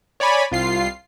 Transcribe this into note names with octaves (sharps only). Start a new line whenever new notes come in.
C#5 D5 G#5 B5
C2 F4 C7